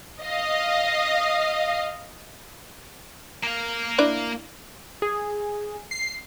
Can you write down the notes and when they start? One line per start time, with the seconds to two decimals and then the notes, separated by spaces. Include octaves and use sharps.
0.22 D#5 F5
3.44 A#3 F5
3.98 D4 E4 D5
5.02 G#4
5.91 C7